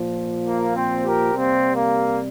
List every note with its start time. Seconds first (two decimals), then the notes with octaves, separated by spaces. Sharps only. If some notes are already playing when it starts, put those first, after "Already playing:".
Already playing: A#2 F3
0.48 A#3
0.76 C4
1.05 G4 A#4
1.33 C3 G3 A#3 C4
1.76 A#3